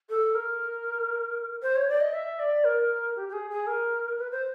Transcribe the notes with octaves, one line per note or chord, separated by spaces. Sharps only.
A4
A#4
C5
C#5
D5
D#5
E5
D5
A#4
G4
G4
G#4
G#4
A#4
B4
C5